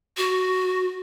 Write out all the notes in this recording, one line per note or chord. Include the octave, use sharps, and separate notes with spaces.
F#4